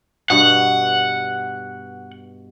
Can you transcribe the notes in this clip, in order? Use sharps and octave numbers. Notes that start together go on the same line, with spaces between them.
G2 B2 F#5